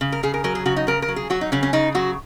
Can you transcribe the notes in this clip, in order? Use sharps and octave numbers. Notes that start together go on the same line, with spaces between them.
C#3
A#4
C#3 G#4
A#4
F#3 A#4
G#4
C#3 F#4
D#4
C#3 A#4
A#4
F#3
G#4
F#3 F#4
D#4
C#3 C#4
C#4
C#3 D#4
F#3 F#4